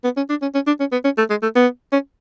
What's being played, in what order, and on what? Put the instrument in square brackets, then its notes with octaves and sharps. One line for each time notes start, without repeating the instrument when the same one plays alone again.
[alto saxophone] B3
C#4
D4
C#4
C#4
D4
C#4
B3
C#4
A3
G#3
A3
B3
C#4